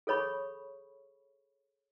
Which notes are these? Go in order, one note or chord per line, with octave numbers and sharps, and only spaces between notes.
G#4 A4 C#5 B5 C#6